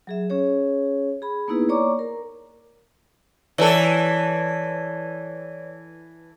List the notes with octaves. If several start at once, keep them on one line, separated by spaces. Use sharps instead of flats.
F#3 G#4 E5
C#4 G#4 C#5
G#4 B5
A#3 B3 D#4 E4 G#4 B4
A#3 C#5 D5 A#5 C#6 D6
A#4
E3 A4 C#5 D5